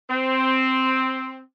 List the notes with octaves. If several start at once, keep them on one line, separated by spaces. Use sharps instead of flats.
C4